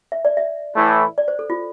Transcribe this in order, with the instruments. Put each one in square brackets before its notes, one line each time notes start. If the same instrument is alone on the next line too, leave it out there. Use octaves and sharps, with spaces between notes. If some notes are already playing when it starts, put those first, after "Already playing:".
[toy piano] E5
D5
E5
[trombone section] A2 E3 A3 E4
[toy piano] D5
C5
A4
F4